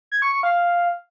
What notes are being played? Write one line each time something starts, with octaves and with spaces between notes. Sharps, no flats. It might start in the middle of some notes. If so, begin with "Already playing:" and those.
G#6
C#6
C#6
F5